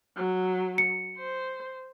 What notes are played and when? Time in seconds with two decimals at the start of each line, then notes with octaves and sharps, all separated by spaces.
0.17 F#3
0.78 C#7
1.17 C5